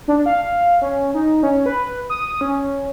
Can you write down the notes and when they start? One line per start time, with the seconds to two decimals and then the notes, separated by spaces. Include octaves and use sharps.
0.08 D4
0.26 F5
0.82 C#4
1.14 D#4
1.43 C#4
1.66 B4
2.10 D#6
2.41 C#4